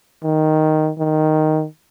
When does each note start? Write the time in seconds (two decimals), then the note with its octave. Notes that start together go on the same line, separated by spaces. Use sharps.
0.24 D#3
0.98 D#3